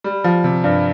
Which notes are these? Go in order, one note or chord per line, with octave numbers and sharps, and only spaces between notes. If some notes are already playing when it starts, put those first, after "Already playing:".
G3
F3
C3
G2